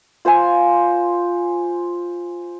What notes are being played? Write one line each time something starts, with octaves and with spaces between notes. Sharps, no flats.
F4 C5 F5 G#5